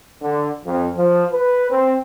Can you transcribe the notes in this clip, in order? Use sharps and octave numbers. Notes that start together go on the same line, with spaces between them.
D3
F2
F3
B4
C4